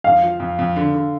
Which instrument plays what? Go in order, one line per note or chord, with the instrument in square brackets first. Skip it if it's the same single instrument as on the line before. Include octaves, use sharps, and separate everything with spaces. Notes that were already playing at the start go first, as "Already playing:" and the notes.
[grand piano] F2 [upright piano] F5
[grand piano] F3
F2
F2
D3
D3